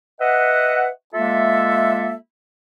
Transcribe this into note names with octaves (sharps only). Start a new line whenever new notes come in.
B4 D#5 E5 F#5
G#3 A#3 F4 A4 E5